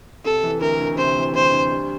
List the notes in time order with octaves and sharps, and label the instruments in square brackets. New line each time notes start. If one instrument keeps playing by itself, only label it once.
[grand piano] C3 [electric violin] A4
[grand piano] E3
[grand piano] D2 [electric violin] A#4
[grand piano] D2
[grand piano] C3 [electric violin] C5
[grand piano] E3
[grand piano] D2 [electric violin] C5
[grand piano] D2
G3